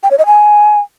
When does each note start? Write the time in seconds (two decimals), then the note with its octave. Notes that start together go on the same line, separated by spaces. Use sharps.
0.03 G5
0.11 C#5
0.18 D#5
0.26 G#5